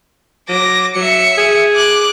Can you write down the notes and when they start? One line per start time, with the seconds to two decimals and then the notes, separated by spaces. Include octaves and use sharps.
0.49 F#3 D6 A#6
0.96 F#3 E5 C#7
1.38 G#4
1.76 D6 F#6